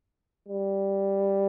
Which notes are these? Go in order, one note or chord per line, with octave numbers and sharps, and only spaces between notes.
G3